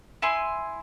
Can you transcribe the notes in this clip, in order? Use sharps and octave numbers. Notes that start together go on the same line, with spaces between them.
E4 G#5 C6